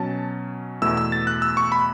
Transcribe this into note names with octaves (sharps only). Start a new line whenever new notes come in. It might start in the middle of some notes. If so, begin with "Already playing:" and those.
Already playing: B2 F#3 C#4 A5
E2 B2 A3 E4 E6
E6
A6
F#6
E6
C#6
B5